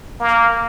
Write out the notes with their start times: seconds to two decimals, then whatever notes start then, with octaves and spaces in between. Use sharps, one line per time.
0.20 A#3